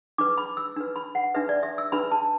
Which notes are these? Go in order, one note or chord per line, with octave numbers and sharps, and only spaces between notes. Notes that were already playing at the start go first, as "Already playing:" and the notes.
D4 B4 D6
B5
E6
D4 B4
B5
F#5
D4 B4 E5
D5
E5
E6
D4 B4 B5
A5